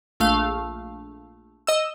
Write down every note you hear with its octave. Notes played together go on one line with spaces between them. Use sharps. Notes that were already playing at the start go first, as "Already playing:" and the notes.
A#1 A3 F5
D#5 E6